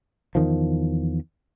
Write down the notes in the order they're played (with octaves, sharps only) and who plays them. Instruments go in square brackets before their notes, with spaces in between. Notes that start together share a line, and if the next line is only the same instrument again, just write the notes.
[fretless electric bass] E2 D#3 F3